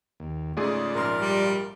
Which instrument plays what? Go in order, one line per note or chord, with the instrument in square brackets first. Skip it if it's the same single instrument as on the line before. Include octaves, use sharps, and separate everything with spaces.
[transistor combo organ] D#2
[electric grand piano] G#2 A3 G#4 [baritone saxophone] C#3 [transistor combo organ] F4 D5
[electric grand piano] A#1 G#2 C6 [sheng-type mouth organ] A#4
[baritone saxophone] G3